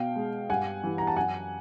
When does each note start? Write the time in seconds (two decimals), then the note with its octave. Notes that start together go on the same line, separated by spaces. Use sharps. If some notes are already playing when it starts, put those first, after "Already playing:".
Already playing: B2 F5 G5
0.16 G#3
0.50 G2 F#5 G#5
0.83 E3 G3
0.98 A#5
1.07 A5
1.16 F#2 F#5 G#5